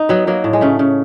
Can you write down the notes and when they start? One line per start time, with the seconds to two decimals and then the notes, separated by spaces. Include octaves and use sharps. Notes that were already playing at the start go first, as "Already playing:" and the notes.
Already playing: D#4
0.09 F#3 B3
0.27 F#3 A#3
0.44 A2
0.53 G#3
0.61 C#3 A3
0.79 C#3